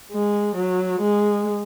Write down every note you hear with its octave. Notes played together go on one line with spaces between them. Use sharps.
G#3
F#3
G#3